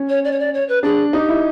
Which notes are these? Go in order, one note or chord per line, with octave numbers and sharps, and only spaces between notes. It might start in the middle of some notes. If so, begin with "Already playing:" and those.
Already playing: C#4
C#5
D5
C#5
D5
C#5
B4
D4 G#4
D#4 G4
E4